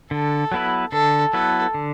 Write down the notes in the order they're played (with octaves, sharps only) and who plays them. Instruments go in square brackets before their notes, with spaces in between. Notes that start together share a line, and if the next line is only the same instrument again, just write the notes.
[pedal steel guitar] D3 [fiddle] A4
[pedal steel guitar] F#3 B3 E4 B4
[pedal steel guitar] D3 [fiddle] A4
[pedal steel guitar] F#3 B3 E4 B4 [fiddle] A4
[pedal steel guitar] D3